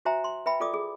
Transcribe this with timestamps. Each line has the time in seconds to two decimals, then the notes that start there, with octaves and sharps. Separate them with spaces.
0.05 F#4 C5 E5 G#5 A#5
0.24 C6
0.46 B4 E5 G5 B5
0.60 F4 A4 D5 D6 D#6
0.74 G#4